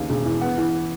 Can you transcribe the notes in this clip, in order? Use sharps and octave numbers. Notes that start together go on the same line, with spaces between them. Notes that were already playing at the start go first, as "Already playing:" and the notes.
Already playing: D#2 C#3
E1
E3
B3
E3